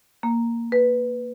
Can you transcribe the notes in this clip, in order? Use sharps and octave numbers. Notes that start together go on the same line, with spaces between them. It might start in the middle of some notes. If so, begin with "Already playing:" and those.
A#3
B4